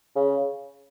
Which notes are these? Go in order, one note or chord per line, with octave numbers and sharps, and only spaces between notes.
C#3